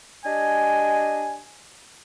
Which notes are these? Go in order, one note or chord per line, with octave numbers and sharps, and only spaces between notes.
D4 G4 D#5 G#5